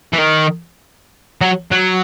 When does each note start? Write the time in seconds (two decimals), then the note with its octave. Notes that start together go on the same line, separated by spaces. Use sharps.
0.13 E3
0.18 D#3
1.41 F#3
1.71 F#3